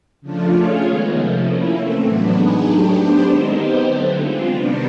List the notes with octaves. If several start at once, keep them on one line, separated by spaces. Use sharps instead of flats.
C#3 F3 A3 D4 F4
A3 C#4 F4 G#4 C#5
D#3 G#3 B3
C3 F3 A3
A#3 C#4 E4
E3 A3 C4
A2 F#3 B3 D4
G#3 B3 D#4 G#4
F#3 A3 D4 G4
B3 D4 G4 C5
D#3 G#3 C4 D#4
B3 D#4 G4 C5
D3 F#3 A3
G#3 C4 F4
C3 D#3 G3 B3 D4